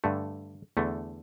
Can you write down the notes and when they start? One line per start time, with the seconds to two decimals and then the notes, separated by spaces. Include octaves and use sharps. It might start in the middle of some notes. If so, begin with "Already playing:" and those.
0.04 G2 D3 A3
0.77 E2 D3 A3